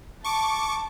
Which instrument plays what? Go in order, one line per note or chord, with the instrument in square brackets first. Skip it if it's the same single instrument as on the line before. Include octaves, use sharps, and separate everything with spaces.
[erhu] A5 [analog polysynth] C#6 D6